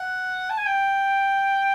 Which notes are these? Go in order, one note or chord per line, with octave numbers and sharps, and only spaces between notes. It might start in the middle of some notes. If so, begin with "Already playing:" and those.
Already playing: F#5
A5
G#5
G5